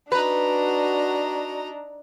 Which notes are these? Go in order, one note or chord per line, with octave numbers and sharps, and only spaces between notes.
D4 D#4 F#4 B4 A#5